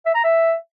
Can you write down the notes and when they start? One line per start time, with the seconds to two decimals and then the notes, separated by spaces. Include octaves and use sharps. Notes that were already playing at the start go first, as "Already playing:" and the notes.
0.06 E5
0.15 A#5
0.23 E5